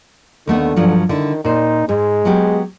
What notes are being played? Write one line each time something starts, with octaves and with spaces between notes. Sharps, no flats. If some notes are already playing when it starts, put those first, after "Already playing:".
D#2 D3 A3 B3
G2 F3 F#3
D3 D#3 E4
A#2 D#4 C5
G#2 G#3
F#3 B3 G4